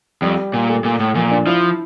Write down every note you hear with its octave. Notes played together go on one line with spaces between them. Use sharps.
F2 G3
A#2 G3
A3
A#2
A2
A#2 F3
D4
F3 E4